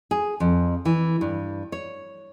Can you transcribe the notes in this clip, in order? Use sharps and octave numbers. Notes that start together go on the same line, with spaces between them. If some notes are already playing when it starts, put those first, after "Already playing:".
G#4
F2
E3
G2
C#5